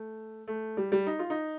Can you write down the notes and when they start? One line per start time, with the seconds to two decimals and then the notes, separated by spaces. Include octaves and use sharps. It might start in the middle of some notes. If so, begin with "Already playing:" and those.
Already playing: A3
0.47 A3
0.77 G3
0.92 G3
1.07 D#4
1.19 F4
1.30 D#4